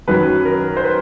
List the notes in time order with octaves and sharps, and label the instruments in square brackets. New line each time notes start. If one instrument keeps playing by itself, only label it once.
[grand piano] F#2 D#3 F#3 B4
A#4
C5
B4